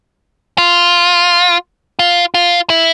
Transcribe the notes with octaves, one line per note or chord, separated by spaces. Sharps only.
F4
F4
F4
E4